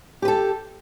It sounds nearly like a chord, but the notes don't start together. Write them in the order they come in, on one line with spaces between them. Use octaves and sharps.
G4 B4 A4